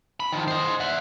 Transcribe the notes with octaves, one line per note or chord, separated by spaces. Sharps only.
B5
D#3 F3
C5 D#5
E5 F#5